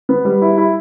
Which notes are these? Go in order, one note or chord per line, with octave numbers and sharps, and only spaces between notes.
B3
G3
E4
E4